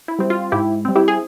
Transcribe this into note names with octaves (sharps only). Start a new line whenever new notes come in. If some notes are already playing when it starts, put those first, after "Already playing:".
E4
G3 C4
F4
G#2 E4 G4
G3 C4
E4 G4
G#4